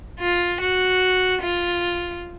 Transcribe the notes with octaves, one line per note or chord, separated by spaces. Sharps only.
F4
F#4
F4